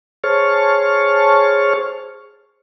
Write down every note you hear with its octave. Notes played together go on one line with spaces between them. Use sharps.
G#4 C5 C#5 A5 C#6 F6